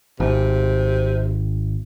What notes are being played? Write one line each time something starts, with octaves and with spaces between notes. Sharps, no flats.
G#1 C3